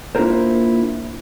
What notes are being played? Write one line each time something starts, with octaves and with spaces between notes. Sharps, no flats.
A#3 D4 E4 F4 A#4 C5